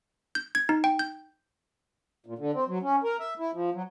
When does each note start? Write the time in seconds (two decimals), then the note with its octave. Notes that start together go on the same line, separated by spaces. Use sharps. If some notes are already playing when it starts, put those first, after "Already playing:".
0.35 G6
0.55 G#6
0.69 D#4
0.84 G5
0.99 G6
2.26 A#2
2.38 D3
2.54 C4
2.68 F#3
2.82 C#4
3.04 A#4
3.20 E5
3.39 E4
3.53 F3
3.74 F#3